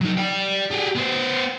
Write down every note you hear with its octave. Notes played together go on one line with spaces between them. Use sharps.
F#3 D#4
D5 G5
G4 G#4
B3 C5